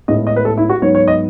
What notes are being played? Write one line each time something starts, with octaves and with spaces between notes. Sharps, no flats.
A2 G#3 B3 D#5
D#5
B4
A4
E4
F#4
G#2 F#3 B3 C#5
C#5
D#5